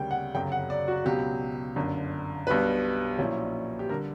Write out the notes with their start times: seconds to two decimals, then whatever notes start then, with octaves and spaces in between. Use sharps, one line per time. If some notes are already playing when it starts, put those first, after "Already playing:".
Already playing: D2 C#3 G3 A#3 G5
0.11 F#5
0.34 G1 F#2 C#3 F#3 G5
0.52 F#5
0.70 D5
0.88 F#4
1.05 C#2 B2 F#3 G4
1.76 G1 F#2 D3
2.47 B1 B2 G3 B3 D4 B4
3.18 A#1 A#2 F#3 C#4 E4
3.79 G4
3.89 D3 G3 A#4